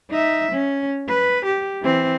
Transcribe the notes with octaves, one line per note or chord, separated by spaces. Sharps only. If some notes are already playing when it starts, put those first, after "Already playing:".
D#4 E5
C#4
B4
G4
E3 C4